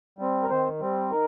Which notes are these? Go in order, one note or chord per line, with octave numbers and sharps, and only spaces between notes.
G3 C4
A#4
D#3 C4 C5
G3 C4
D#3 A#4